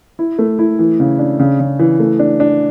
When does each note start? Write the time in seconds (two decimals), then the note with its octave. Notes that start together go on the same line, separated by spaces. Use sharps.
0.19 E4
0.39 A3
0.59 E4
0.79 E3
1.00 C#3
1.19 D4
1.39 C#3
1.60 C#3
1.79 E3
2.00 A3
2.19 D4
2.40 D4